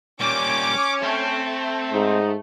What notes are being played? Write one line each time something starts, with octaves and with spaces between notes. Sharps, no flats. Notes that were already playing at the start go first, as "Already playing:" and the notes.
A#2 G3 C#4 C#5 D6
A3 C4
G#2 D#4